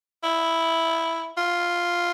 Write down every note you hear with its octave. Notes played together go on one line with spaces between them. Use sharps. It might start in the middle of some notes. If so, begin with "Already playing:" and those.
E4
F4